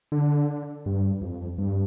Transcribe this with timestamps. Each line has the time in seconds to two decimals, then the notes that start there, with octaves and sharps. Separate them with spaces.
0.12 D3
0.86 G2
1.22 F2
1.58 G2